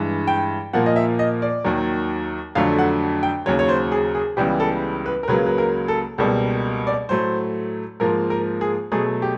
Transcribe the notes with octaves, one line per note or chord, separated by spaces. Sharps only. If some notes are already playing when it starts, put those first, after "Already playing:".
Already playing: G2 E3 G#3
G5
A#2 F3 A#3 F#5
D#5
E5
D#5
D5
D#2 D#3 F#3
F2 D3 F#3 A3 F5
F#5
G5
D#2 C#3 F#3 C#5
C#5
C5
G#4
G#4
C#2 C#3 E3 G3 B3 G4
A4
B4
A#4
C#2 C#3 F#3 A#3 B4
B4
A#4
A4
C#2 B2 G3 A#3 A4
D5
A2 F#3 A3 C5
G#2 F3 A#3 A#4
A#4
G#4
B2 F#3 A3 G#4
G4